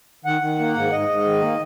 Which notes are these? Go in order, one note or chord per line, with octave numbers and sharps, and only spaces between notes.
D#3 F#5
D#3
A#3
G#2
G#2 D#5
G#2
D#3
A#3